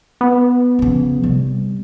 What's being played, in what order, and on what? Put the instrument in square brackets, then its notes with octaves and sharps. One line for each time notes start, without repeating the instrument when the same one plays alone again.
[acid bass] B3
[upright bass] C#3 F3
C3 G3